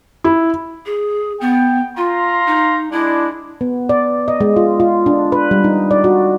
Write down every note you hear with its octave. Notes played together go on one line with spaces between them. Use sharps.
E4
G#4
B3 G5
F4 F5 A#5 C6
D#4
G#3 D4 E4
B3
D5
D#5
G#3
F4
F4
D4
B4
G3
D#4
D5
F#4